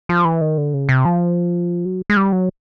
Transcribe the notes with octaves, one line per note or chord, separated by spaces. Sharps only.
F3
E3
D#3
D3
C#3
C3
F3
F#3
G#3
G3
F#3